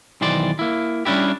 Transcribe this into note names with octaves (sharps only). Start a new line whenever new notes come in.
B1 D#3 E3 C5 D5
A#3 E4
G3 C#4 D4 E4 G4